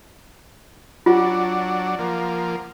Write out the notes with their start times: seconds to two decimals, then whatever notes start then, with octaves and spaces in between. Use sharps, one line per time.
1.06 F#3 D4 F4 F#5 D6
1.99 F3 A#3